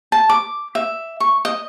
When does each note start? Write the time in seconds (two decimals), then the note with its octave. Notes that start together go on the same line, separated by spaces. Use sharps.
0.12 A5
0.30 D6
0.75 E5
1.20 C#6
1.45 D#5